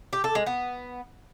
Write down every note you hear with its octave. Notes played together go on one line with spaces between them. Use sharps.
G4
A4
G#3
B3